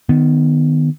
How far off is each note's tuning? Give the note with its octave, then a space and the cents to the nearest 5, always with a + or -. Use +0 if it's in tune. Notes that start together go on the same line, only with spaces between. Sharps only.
D#3 -20 B3 +5